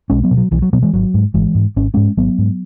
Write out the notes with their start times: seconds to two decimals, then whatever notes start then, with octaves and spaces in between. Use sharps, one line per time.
0.10 B1 G#3 C#4
0.23 F#3 B3
0.31 B2
0.37 F#3
0.51 B1 E3
0.62 F#3
0.73 B2 F#3 B3
0.83 E3 G#3
0.93 G#1 F#3
1.14 G#2
1.34 G#1 E3 G#3
1.55 G#2
1.76 G#1 C#4
1.94 G#2 G#3 C#4
2.17 G#1 F#3 B3
2.38 G#2